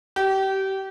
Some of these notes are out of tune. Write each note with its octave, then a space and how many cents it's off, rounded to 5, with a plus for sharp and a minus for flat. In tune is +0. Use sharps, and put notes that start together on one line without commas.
G4 -30